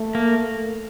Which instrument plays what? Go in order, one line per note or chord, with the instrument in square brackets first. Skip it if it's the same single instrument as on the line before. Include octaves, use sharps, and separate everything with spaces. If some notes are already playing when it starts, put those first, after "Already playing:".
Already playing: [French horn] A3
[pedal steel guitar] A#3